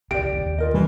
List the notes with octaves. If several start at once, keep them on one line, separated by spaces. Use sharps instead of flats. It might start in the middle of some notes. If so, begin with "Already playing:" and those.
G1 C#2 G4 D5 D7
D#2
F4 A#4 D#5
G2 C3 E3